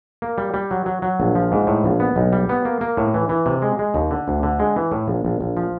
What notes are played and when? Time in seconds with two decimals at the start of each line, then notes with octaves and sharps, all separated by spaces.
0.22 A#3
0.38 G3
0.54 G3
0.71 F#3
0.86 F#3
1.02 F#3
1.20 A#1
1.35 F3
1.52 G#2
1.67 A2
1.84 A#1
2.00 B3
2.16 B1
2.33 G3
2.49 B3
2.65 A#3
2.81 A#3
2.97 A2
3.14 E3
3.29 E3
3.46 C3
3.62 G#3
3.79 G#3
3.94 D#2
4.11 D3
4.28 D2
4.43 D3
4.59 G#3
4.76 E3
4.92 A2
5.08 A#1
5.25 A#1
5.41 A#1
5.57 F3